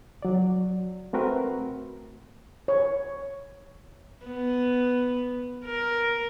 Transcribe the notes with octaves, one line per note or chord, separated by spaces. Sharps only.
F#3 D5
A3 C4 F#4 A#4 B4
C#5
B3
A#4